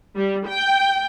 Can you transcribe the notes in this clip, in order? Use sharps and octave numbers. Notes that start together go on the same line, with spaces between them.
G3
G5